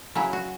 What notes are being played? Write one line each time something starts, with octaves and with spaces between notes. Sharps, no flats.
C#3 F#3 C#4 E4
F#4